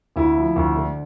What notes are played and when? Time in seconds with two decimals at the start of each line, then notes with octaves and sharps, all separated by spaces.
0.16 D2 E4
0.36 F3
0.56 D2
0.76 D3